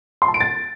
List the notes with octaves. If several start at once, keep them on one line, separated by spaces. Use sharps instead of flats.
C6
A5
D7
A6